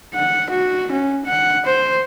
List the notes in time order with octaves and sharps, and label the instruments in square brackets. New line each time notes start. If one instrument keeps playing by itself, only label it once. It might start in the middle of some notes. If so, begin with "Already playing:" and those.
[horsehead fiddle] F#5
F#4
C#4
F#5
C5